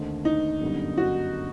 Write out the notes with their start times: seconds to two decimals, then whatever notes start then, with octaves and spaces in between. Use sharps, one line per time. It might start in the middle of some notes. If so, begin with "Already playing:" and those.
Already playing: D#2 D3 A3 C4 D#4
0.25 D#4
0.61 G1 F#2 D3 G3
0.98 F#4